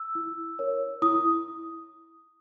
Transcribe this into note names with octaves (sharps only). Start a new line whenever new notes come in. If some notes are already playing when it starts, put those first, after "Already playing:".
Already playing: E6
E4
A#4 C#5
E4 D#6